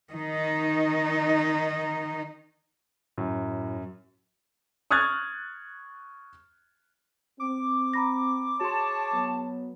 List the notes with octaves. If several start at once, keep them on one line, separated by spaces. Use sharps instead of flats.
D#3 D#4
F#2 A2
C#6 D#6 F6 F#6 G#6 A6
C4 D6
A#5 B5 A#6
F#4 G#4 C#5 A5 C6
F#3 B3